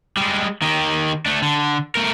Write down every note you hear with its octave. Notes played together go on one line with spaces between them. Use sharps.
G3 G#3
D#3 G4
A3 D4
D3
A3 A#4